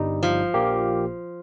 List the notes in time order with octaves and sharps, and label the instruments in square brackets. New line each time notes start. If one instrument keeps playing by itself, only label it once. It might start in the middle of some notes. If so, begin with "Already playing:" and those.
Already playing: [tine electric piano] G1 G2 G3 D#4
[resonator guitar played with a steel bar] F3
[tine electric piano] A#1 A#2 A#3 G4